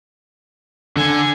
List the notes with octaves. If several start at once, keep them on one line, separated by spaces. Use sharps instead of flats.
D3 G#5 G#6